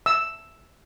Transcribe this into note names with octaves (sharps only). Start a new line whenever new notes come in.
E6